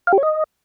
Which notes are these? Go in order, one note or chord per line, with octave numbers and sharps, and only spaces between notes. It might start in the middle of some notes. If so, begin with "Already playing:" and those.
F5
G4
C#5
D#5